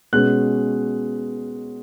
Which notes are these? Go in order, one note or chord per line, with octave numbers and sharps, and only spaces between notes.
B2 G#3 C#4 F#6